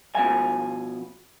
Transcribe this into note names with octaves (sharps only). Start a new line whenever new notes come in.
B2 F3 G#5